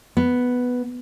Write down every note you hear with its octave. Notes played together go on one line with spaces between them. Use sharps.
B3